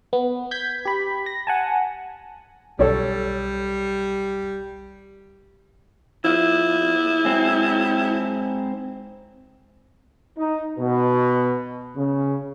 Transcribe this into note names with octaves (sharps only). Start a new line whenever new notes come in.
B3
G6 G#6 B6
G4 B5
A#6
F#5 G#5 A5
B1 G3 A4 C#5 D5
F3 E4
G#2 F#3 C4
D#4
B2
C#3